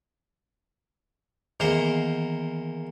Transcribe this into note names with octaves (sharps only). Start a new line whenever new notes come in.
E2 D#3 A#3 C5